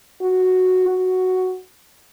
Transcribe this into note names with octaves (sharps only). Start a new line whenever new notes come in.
F#4
F#4